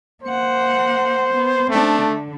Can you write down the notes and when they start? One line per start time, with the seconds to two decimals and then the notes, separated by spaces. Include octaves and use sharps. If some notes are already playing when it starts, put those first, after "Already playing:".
0.24 A#3 C5 F#5
1.33 B3
1.70 A3 C4 D4
2.01 D3